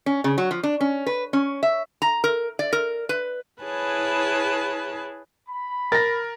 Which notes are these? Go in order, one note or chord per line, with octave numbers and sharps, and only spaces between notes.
C#4
C#3
F#3
F3
D4
C#4
B4
C#4
E5
A#5
A#4
D5
A#4
B4
E4 G#4 B4 C#5 A5
B5
A#4 A6 A#6